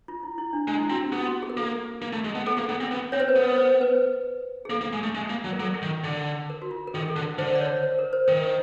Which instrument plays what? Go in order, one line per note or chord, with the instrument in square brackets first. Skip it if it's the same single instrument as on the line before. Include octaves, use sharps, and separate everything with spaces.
[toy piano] F4
E4
E4
D4
[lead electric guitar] G#3 [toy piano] D4
[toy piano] E4
[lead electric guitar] C4 [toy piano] F#4
[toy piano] G4
[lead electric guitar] B3 [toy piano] G#4
[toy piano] F#4
G#4
A#4
[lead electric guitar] A#3 [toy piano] A4
[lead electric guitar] A#3
A3
G#3
B3
[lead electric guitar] B3 [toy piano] A4
[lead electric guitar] A#3 [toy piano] G#4
[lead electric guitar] B3 [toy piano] A4
[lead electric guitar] C4
B3
[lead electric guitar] C4 [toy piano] C#5
[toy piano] C5
B4
[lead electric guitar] B3 [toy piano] A#4
[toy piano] C5
B4
G#4
[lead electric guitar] A#3 [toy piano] A4
[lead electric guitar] A#3
G#3
A3
G#3
A#3
F#3
[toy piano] A#4
[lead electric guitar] F#3 [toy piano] A4
[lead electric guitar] D#3
D3
[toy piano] A#4
F#4
F4
A#4
[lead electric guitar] D#3 [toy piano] A4
[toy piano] G#4
A4
[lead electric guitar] D3
[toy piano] A#4
[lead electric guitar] D3 [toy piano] C5
[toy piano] D5
C#5
C5
A#4
C5
[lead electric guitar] D#3 [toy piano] A#4